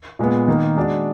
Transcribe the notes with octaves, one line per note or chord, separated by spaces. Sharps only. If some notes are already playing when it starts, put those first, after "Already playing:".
A#2 G#3 B3
D#3 A#3 D#4
G#3 D4 F#4 D5